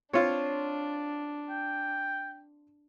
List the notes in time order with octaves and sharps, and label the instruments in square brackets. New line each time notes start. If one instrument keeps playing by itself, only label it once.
[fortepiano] C4 F4 [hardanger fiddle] D4 [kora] C#5
[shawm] G5